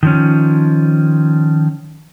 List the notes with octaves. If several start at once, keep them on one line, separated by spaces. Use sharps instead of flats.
D#3 F3 C#4